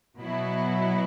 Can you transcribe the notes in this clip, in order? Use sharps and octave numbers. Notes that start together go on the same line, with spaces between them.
B2 F#3 B3 E4